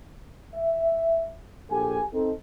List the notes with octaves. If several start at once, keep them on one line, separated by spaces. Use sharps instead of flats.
E5
A#1 G4 A4 G#5
C4 D#4 A4